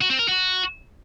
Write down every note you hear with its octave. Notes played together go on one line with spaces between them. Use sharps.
F#4
C4
A#4
F#4